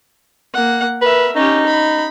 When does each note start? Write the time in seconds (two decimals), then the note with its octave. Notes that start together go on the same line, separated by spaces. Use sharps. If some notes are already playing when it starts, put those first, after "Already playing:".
0.54 A#3 F#5
1.02 A#4 B4 E5
1.36 C#4 D#4 G4
1.66 B5